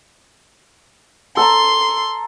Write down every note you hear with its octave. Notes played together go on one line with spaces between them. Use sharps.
A4 A5 A#5 C6